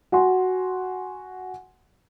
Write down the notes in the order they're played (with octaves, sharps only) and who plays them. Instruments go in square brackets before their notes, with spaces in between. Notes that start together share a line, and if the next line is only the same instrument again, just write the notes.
[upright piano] F#4 F#5 G#5 C6